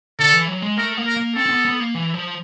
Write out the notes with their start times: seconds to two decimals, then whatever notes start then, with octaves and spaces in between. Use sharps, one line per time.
0.19 D3 A4
0.33 E3
0.48 F#3
0.62 G#3
0.78 A3 A#4
0.97 A#3
1.07 A#4
1.17 A#3
1.36 C4 A4
1.46 C4
1.50 B3
1.65 B3
1.80 A#3
1.95 E3
2.14 F3